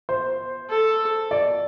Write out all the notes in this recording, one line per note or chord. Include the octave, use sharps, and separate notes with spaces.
C5
A4
D5